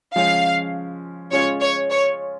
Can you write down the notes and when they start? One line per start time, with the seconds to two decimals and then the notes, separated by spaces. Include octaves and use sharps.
0.15 C#3 F3 G#3 C#4 F5
1.31 C#3 G#3 C#4 F4 C#5
1.61 C#5
1.90 C#5